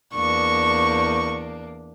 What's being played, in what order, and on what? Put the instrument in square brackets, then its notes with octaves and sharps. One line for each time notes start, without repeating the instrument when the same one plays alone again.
[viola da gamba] E2 A#3 D4 [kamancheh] C#6